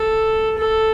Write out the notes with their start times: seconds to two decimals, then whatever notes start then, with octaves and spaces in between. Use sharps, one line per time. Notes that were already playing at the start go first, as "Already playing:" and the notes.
Already playing: A4
0.58 A4